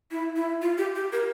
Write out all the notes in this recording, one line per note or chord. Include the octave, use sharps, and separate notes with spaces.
E4
E4
F4
G4
G4
A#4